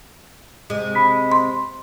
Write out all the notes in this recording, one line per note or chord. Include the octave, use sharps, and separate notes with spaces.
C3 G#3
B5 B6
C6